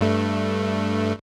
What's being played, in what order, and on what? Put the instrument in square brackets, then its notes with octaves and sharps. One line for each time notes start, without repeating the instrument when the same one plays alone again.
[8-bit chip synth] G2 A3